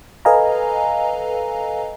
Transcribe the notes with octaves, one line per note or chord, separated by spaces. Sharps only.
A4 B4 D#5 F5 G#5 A#5